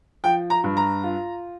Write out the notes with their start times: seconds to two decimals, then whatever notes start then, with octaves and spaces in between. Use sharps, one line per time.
0.24 F3 G5
0.50 A#5
0.64 G2
0.77 A#5
1.03 F4